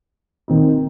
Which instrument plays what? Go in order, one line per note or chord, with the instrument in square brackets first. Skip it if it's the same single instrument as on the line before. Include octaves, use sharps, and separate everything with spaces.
[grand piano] D#3 C4 D#4